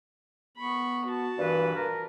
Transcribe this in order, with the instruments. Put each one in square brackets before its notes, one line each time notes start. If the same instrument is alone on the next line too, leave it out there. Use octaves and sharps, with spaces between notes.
[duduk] B3 [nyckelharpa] B5 C#6
[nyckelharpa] F#4 A5
[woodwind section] G2 A#2 B4 [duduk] E3
[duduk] A#4